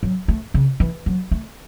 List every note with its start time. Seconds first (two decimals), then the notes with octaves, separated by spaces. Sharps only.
0.03 F#3
0.28 A3
0.54 C#3
0.80 E3
1.06 F#3
1.31 A3